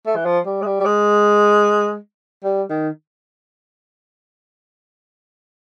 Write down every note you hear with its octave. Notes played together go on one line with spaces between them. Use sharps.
A3
E3
F3
G3
G#3
G3
G3
G#3
G3
D#3